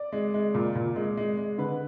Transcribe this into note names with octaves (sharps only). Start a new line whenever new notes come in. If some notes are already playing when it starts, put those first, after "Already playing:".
Already playing: D5
G#3
G#3
A#2
A#2
G#3
G#3
G#3
D3 B4